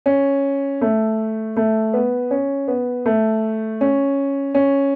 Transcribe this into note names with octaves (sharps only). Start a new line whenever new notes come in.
C#4
A3
A3
B3
C#4
B3
A3
C#4
C#4